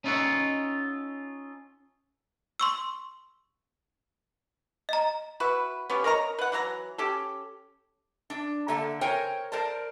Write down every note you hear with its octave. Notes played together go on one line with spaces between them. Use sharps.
C#4 D#4 F4 A4 C#5 F#5
C6 C#6 E6
D#5 A#5
E4 F#4 B4
B3 C#4 G4
A#4 C#5 D#5 A#5
B4 F#5
E3 F#3 A#4 A#5
C#4 G4 A4
D4
D3 A#3 E5 A5
A#4 C5 C#5 G5 G#5
A#4 C5 D5 A5